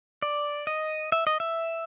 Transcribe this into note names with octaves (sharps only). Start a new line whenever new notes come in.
D5
D#5
E5
D#5
E5